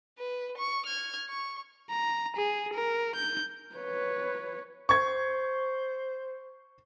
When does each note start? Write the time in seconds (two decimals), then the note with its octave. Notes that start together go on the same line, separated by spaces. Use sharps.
0.19 B4
0.58 C#6
0.86 F6 G#6
1.29 C#6
1.90 A#5
2.37 G#4
2.74 A#4
3.16 G6
3.75 B4 C#5
4.89 C5 C#6 G#6